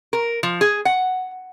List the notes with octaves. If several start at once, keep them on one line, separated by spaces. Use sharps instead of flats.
A#4
F3
G#4
F#5